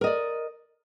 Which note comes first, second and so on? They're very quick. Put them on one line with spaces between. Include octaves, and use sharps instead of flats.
A#4 D#5 D5